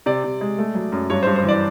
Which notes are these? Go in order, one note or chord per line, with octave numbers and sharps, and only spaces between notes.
C3 D5
C3
G#3
A3
F#3
F#2
G2 C#5
C5
G2
C5
E3 D5